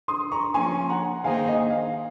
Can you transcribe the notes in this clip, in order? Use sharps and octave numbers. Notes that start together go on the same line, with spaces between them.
C6 D#6
A#5 C#6
F3 A#3 C#4 G#5 C6
F#5 A#5
D#3 A#3 D#4 G#4 C5 F5 G#5
D#5
F5